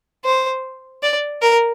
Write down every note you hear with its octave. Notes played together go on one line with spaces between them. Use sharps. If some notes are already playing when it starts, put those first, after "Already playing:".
C5
D5
A#4